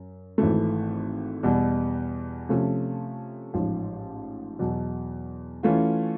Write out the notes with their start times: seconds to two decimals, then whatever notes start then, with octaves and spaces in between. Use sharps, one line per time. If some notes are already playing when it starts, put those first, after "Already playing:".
Already playing: F#2
0.38 G#1 G#2 E3 A3
1.43 E2 B2 G3
2.49 C3 F3 A3 C#4
3.54 A1 G#2 F3
4.59 E2 B2 F#3
5.63 E3 A3 C#4 F4